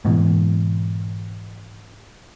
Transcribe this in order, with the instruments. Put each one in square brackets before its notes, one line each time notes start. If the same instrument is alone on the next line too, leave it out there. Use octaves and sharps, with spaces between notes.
[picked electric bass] G#2 B2 E3